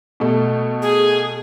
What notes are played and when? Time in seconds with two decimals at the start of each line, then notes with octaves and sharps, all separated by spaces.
0.20 B2 A3
0.82 G#4